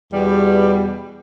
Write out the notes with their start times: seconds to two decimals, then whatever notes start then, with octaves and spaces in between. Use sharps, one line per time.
0.12 E2 B2 G3